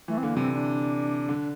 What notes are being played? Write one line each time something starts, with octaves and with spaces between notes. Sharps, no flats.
E3 A3
C4
D3 A#3
C3 E3 C4
D4
D3